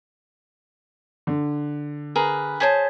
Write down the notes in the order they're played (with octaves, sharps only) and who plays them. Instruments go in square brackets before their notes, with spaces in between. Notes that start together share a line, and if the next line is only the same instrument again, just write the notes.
[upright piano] D3
[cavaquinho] G#4 A#4 B4
[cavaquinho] G#4 C5 A5 [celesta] C#5 G#6 B6